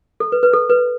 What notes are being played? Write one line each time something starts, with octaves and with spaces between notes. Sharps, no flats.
A4
B4
B4
A4
B4